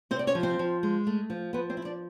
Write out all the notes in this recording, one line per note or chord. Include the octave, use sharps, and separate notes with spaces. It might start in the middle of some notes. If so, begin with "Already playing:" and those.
C3 C4 C5
D5
C#4 C#5
F3
C4 C5
F3
G#3
A3
F3
F3 B3 B4
C4 C5
E4
D4 D5